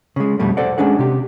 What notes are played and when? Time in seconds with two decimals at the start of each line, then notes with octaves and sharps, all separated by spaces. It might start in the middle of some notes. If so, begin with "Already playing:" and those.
0.16 C#3 G#3
0.39 F2 B2 G3 A3
0.57 A4 C5 D5 F#5
0.78 G#3 C#4 D4 G#4 F#5
0.99 C3 G4